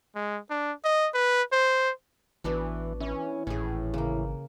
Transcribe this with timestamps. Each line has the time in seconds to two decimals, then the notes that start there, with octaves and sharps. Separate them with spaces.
0.15 G#3
0.50 D4
0.84 D#5
1.14 B4
1.52 C5
2.44 A1 E3 B3 D4 F#4
3.00 E3 C#4
3.47 G#1 A2 C#4 G#4
3.94 C#3 A#3